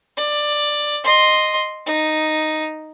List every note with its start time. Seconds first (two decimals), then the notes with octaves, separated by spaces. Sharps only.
0.17 D5
1.04 D#5 C6
1.87 D#4